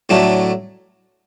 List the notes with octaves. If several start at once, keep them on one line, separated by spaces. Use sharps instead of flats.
A2 F#3 A3 D4